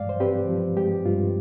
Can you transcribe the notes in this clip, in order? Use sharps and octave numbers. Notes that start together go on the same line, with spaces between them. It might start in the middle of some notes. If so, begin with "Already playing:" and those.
Already playing: G2 G#3 D5 F5
C5
C4 G4 B4
F3
G#3 G4
G2 F4